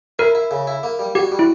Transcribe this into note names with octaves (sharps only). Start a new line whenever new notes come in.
E4 A#4
E4
C#3
E4
A#3
G3
F#4 G4
G3
E4